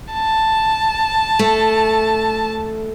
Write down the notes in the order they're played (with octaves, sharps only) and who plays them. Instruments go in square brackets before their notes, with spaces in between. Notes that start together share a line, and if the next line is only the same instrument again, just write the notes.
[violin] A5
[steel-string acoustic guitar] A3